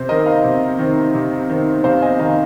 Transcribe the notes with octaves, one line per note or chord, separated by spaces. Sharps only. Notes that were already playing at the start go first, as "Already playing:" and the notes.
Already playing: C3 C5
D#3 C4 A#4 D#5
F5 A#5
C3
D#3 C4
C3
D#3 C4
C3 C5 F5
D#5 G#5
D#3 C4 F5 A#5